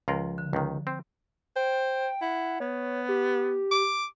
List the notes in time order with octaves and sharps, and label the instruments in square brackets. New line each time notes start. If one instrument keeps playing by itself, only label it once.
[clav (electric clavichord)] C#2 F4 A#4 [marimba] F3
[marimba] D3
[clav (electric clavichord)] C#2 D#3
C4
[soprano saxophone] C5 [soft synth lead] G5
[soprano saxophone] E4 [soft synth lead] F#5
[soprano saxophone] B3 [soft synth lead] C#5
[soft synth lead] G4
[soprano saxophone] D6